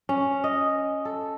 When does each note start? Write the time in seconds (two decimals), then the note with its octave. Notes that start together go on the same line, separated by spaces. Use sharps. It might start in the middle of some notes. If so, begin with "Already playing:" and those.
0.09 C#4
0.44 D#5
1.05 A4